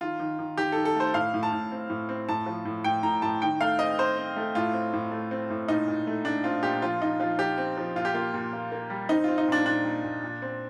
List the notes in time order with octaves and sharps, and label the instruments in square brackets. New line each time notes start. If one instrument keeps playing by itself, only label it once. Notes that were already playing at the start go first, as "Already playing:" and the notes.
[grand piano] D#3 F4
D#3
D#3
D#3 G4
D#3 A4
A4
A3 C5
A2 F5
A2
A5
A2
C4
A2
C4
A2 A5
F3
A2
A2 G5
A2 A#5
A2 A5
D#3 G5
A3 F5
C4 D#5
C4 C5
C4
A3
A2 F4
C4
A2
A3
C4
A2
A#2 D#4
A#2
A3
A3 D4
C4 F4
A#2 G4
F3 F4
A#2 D#4
F3 F4
F3 G4
C4
F3
A#2 F4
G4
A#3 F4
A#2
A#3
A#3
G3
C4 D#4
C4 F4
D#4
A#2 D4
A#2 D4
A#2
A#2
A#2
C4